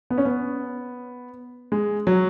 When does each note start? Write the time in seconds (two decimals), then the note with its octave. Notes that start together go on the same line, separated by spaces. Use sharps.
0.10 B3
0.18 C#4
0.25 B3
1.72 G#3
2.07 F#3